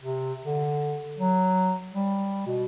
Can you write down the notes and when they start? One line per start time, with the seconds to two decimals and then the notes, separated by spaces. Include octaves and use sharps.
0.01 C3
0.44 D3
1.18 F#3
1.92 G3
2.46 B2